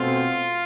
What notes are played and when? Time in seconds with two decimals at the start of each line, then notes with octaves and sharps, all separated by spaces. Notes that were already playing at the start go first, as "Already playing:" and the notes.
Already playing: B2 A3 C4 F4